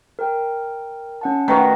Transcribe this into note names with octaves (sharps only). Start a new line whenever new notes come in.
A#4 G5
C#4 F#5 A5
D#3 A3 F#4 B4